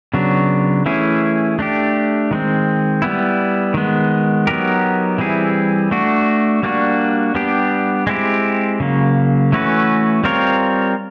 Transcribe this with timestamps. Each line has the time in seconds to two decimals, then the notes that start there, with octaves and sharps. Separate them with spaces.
0.14 C#3 F#3 B3 D4
0.86 E3 A3 C#4 E4 G#4
1.59 A3 D4 G4
2.31 D#3 G#3 C4
3.02 G3 B3 E4
3.74 D#3 G#3 B3
4.47 F#3 B3 D#4 G4 A#4
5.18 E3 G3 C4 E4 G#4
5.91 A3 D4 F#4
6.63 G3 A#3 D4 F#4
7.35 G3 B3 D4 G4
8.07 G#3 C4 E4 G4
8.80 C#3 F#3 A#3
9.52 E3 A3 C#4 F#4 B4
10.24 G3 C4 F4 A#4 C#5